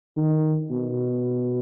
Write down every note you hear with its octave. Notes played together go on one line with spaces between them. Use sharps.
D#3
B2